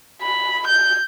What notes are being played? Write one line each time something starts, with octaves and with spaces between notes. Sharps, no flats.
B5
G6